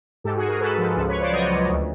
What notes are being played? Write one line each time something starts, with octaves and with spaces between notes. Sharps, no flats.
G#2 G4 A4
F#4 G#4
G#2
G#4 A#4
G#2 A4 B4
F3
C#2 A4 B4
B4 C#5
C#2
C5 D5
F#3 C#5 D#5
C#2
D2